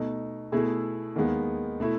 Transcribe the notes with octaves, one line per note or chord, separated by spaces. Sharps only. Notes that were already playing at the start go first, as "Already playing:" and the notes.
Already playing: B2 A3 D#4
B2 A3 E4 G#4
D#2 D#3 G#3 B3
B2 A3 E4